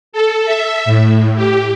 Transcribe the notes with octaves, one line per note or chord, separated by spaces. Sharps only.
A4
E5
A2
G4